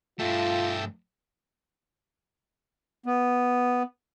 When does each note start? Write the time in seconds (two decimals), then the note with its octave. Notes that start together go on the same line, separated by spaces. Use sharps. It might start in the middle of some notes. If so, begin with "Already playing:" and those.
0.19 G2 A3 F4 A4 E5 G5
3.06 B3